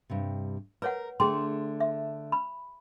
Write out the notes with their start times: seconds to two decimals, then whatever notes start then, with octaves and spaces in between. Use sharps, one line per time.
0.10 G2 C3
0.82 A#4 B4 C#5 F#5
1.20 D3 A3 D4 G#4 G5 C6
1.80 E5
2.32 B5